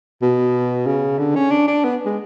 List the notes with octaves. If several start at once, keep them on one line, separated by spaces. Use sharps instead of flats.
B2
C#3
D3
C#4
D4
D4
B3
G#3